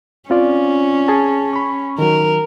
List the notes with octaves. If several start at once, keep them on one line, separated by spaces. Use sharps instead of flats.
C4 C#4 F4 D5
G#4 A5
B5 C#6
D#3 F#3 A#4